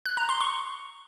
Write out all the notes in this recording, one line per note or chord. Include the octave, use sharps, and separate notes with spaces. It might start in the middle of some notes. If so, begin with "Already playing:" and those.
F#6
A#5
C6
C#6